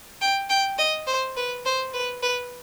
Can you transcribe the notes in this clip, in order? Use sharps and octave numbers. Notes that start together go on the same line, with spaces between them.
G5
G5
D#5
C5
B4
C5
B4
B4